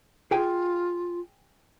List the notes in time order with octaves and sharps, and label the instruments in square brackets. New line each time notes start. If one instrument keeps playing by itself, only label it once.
[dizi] F4 [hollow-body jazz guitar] G#4 G5 G#5